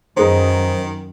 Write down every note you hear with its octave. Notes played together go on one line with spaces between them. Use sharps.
F#2 D#3 D#4 G#4 B4 C5